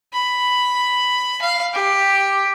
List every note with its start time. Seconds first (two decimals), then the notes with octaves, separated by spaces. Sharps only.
0.13 B5
1.42 F5
1.74 G4